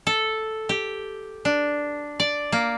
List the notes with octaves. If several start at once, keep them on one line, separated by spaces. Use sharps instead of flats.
A4
G4
D4
D5
A#3